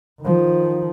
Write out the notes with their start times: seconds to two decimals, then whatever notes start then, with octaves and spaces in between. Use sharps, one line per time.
0.22 D#3 F3